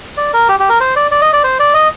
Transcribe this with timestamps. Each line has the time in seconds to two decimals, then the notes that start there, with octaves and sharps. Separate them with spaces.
0.17 D5
0.34 A#4
0.49 G4
0.60 G4
0.69 A#4
0.80 C5
0.96 D5
1.11 D5
1.22 D#5
1.33 D5
1.44 C5
1.59 D5
1.74 D#5